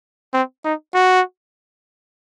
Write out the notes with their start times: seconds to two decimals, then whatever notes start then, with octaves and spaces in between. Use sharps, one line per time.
0.33 C4
0.65 D#4
0.94 F#4